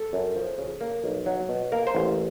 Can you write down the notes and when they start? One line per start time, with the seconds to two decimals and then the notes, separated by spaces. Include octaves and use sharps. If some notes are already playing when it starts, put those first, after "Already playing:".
Already playing: A4
0.13 F#2
0.36 F3
0.58 C#3
0.81 A#3
1.04 B1
1.26 F#3
1.49 B2
1.72 A#3 A#4
1.87 C5
1.95 A1